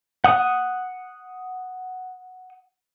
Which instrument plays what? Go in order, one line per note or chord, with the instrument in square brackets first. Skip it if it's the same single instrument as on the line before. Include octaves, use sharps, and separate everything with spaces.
[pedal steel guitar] F#5 D#6